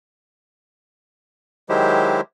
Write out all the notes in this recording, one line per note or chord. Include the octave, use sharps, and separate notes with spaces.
D#3 F#3 G#3 E4 G4 C5